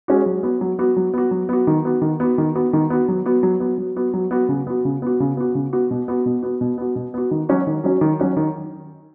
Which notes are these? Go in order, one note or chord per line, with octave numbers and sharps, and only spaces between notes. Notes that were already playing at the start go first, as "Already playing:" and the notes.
G#3 C#4 F#4
F#3
B3 F#4
F#3
B3 F#4
F#3
B3 F#4
F#3
B3 F#4
D#3
B3 F#4
D#3
B3 F#4
D#3
B3 F#4
D#3
B3 F#4
F#3
B3 F#4
F#3
B3 F#4
F#3
B3 F#4
F#3
B3 F#4
C#3
B3 F#4
C#3
B3 F#4
C#3
B3 F#4
C#3
B3 F#4
B2
B3 F#4
B2
B3 F#4
B2
B3 F#4
B2
B3 F#4
D#3
F#3 C#4 F#4
D#3
F#3 C#4 F#4
D#3
F#3 C#4 F#4
D#3